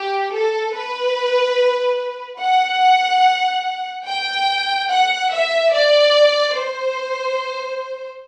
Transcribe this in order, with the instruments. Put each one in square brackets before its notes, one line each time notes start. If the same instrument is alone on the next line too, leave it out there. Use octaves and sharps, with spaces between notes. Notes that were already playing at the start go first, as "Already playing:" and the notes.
Already playing: [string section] G4
A4
B4
F#5
G5
F#5
E5
D5
C5